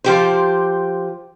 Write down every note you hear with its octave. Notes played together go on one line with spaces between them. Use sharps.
F3 G4 C5